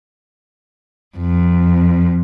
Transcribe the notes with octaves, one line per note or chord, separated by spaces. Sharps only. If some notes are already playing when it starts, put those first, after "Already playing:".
F2